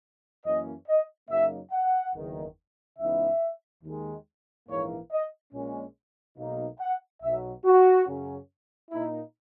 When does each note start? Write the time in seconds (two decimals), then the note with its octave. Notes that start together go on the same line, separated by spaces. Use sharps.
0.45 F#2 E3 A#3 C#4 D#5
0.87 D#5
1.30 F#2 C#3 F#3 A#3 D#4 E5
1.72 F#5
2.15 F#1 E2 D#3
2.99 C#2 C#3 E3 B3 D#4 E5
3.83 D#2 D#3 G#3
4.68 A#1 G#2 E3 A#3 C#5
5.11 D#5
5.53 A#1 A#2 G#3 C#4
6.37 B1 B2 A#3 D#4
6.79 F#5
7.22 B1 B2 F#3 E5
7.65 F#4
8.07 F#2 C#3 F#3 C#4
8.91 A#2 A#3 D#4 E4